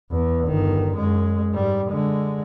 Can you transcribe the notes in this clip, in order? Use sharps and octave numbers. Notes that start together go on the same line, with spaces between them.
E2
G1 D#3
F#2 G#3
G#2 G3
D3 G#3